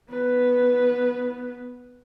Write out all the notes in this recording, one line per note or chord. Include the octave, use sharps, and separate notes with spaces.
B3 B4